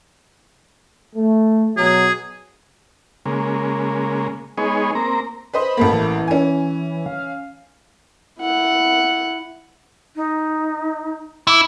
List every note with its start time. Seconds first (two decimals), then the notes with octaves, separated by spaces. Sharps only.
1.15 A3
1.77 B2 F#3 G#4
3.26 C#3 G#3 A#3
4.58 G#3 B3 D#4 G#4 C#5
4.95 A#3 C4 A#5
5.54 B4 C5 D#5 B5
5.77 A1 A3 A#3
5.93 E3
6.28 C#4 G#5
7.06 F5
8.39 E4 F#5
10.16 D#4
11.47 E4 D6